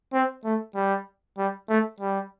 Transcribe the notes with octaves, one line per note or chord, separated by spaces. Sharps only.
C4
A3
G3
G3
A3
G3